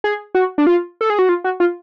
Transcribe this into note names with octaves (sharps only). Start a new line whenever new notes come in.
G#4
F#4
D4
F4
A4
G#4
F#4
F4
F#4
F4